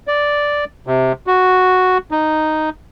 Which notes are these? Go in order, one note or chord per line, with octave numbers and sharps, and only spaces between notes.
D5
C3
F#4
D#4